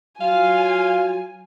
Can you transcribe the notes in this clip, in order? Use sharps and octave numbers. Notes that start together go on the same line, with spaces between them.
F#3 F4 F5 G#5